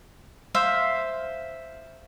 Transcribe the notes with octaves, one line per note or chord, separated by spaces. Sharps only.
C5 E5 F5